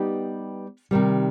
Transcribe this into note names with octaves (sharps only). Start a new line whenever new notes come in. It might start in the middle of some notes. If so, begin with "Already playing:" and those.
Already playing: G3 B3 D#4 G4
C3 D#3 G3